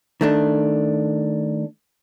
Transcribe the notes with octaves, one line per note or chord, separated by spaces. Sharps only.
D#3 A3 D4